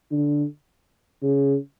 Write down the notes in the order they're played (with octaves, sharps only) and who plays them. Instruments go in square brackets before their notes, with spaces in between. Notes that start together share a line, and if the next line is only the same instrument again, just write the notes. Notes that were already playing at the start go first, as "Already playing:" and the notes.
[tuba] D3
C#3